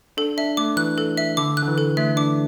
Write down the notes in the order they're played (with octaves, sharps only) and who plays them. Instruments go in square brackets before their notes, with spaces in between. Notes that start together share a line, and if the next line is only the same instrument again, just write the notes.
[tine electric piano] D4 [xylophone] A4
[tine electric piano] D4 [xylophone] E5
[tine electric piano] A3 [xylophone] D6
[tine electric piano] E3 [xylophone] F#6
[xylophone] A4
E5
[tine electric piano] D3 [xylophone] D6
[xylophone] F#6
[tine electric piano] D3
E3
[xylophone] A4
[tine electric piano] A3 [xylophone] E5
[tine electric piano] D4 [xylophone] D6